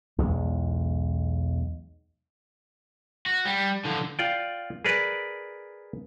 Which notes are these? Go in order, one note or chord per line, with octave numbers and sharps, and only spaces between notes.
B1 E2 G#3
F#4
G3
D3 F3
F4 D5 G5
G#4 A#4 B4 D5